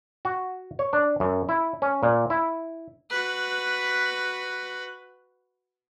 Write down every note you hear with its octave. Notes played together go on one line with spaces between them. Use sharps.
F#4
C#5
D4
F#2
E4
C#4
A#2
E4
F#4 B4